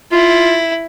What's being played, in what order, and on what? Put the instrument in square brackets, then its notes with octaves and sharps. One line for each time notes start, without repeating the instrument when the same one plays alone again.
[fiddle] E4 [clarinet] F4